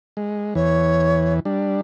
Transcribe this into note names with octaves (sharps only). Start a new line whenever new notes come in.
G#3
E2 E3 C#5
G3 D4